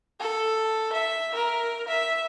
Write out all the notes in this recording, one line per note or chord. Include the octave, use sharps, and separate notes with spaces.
A4
E5
A#4
E5